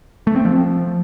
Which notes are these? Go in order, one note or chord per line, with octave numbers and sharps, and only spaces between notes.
A3
C4
F3